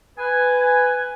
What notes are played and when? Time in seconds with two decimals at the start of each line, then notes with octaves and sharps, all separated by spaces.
0.18 B4 G#5